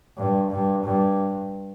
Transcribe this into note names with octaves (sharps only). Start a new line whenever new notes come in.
G2
G2
G2